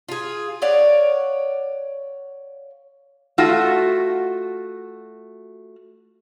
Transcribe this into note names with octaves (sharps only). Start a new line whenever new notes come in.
F4 G#4
C#5 D5 F5 F#5
A3 F4 F#4